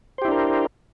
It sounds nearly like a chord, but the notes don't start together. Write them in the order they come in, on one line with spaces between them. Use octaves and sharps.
C5 G4 E4 D4 A#4